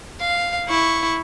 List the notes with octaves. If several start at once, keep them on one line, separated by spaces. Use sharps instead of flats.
F5
E4 C#6